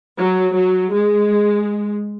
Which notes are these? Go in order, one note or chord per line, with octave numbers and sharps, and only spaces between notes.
F#3
F#3
G#3